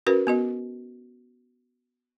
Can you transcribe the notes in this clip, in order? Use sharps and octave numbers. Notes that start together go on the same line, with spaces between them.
C#4 F#4 A#4 B4
B3 F#4 D#5